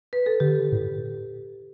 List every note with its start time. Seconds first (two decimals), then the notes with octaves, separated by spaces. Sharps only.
0.13 B4
0.26 A4
0.40 D3 G4
0.72 A2